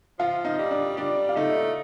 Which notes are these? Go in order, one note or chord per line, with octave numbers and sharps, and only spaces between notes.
F3 F4 F5
D#4 D#5
G3
D4 D5
G3 D4 D5
F5
A3 D#4 D#5